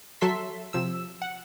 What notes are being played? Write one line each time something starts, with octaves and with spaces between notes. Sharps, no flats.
F#3 A4 E5 C6 B6
C3 F3 E6
F#5